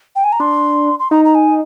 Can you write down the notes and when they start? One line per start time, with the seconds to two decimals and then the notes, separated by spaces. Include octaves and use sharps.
0.16 G5
0.24 G#5
0.32 A#5
0.40 D4 C6
0.99 C6
1.11 D#4 A#5
1.25 A#5
1.35 G#5